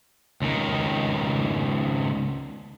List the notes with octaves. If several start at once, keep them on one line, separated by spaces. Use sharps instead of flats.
C#2 D#3